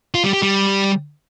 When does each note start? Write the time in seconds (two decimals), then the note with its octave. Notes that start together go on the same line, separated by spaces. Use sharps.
0.14 F4
0.24 G3
0.33 G4
0.42 G3